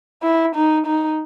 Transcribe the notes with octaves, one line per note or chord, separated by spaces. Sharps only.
E4
D#4
D#4